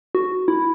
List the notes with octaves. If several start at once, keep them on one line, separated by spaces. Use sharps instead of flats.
F#4
E4